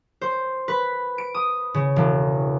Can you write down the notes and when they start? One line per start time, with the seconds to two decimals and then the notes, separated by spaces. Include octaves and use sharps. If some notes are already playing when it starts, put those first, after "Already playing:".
0.21 C5
0.68 B4
1.18 D7
1.35 D#6
1.74 C#3
1.96 E1